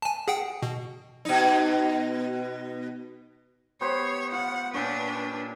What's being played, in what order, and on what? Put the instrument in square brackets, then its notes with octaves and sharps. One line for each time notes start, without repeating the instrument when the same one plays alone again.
[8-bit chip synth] G#5 A5
G#4 F#5 G5
B2
[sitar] B2 D#4
[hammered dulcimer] B3 G4 C5 [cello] C#5
[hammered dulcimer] F4 [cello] F#5
[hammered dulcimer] A#2 C#5 [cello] D4 B4